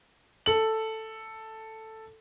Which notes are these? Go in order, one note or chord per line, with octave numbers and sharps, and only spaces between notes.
A4 F#7